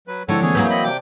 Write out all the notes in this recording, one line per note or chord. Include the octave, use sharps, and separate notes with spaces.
F#3 B4
D3 F3 G#3 C4 E4 A4 C#5
D2 E3 A#3 C4 G#4 C#5
E3 F#3 A#3 G6
C4 D#5 B5
C3 C5 D5 G5 A5 D6